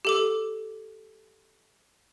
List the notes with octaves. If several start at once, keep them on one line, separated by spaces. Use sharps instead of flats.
G4 A4 D6